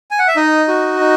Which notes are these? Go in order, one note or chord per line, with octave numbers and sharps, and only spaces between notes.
G#5
F#5
E5
D#4 D#5
F#4
D#4